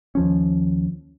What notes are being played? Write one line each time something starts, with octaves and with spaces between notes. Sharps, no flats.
D#2 F3 C#4